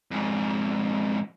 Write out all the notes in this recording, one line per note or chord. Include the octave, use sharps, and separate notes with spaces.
F2 G#2